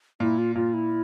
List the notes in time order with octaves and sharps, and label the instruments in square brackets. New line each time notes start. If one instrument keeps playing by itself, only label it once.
[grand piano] A#2 [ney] E4
[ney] F4
[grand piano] A#2 [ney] F4
[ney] E4